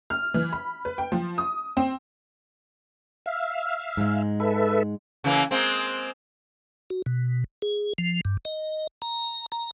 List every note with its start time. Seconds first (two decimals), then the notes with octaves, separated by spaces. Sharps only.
0.10 F6
0.34 E3
0.53 B5
0.85 B4
0.98 G5
1.12 F3
1.38 D#6
1.77 C4
3.26 E5 F5
3.97 G#2 G#3
4.40 A4 B4 E5
5.24 C#3 E3 A#3
5.51 G#3 A#3 C4
6.90 F#4
7.06 B2
7.62 G#4
7.98 F3
8.25 G2
8.45 D#5
9.02 A#5
9.52 A#5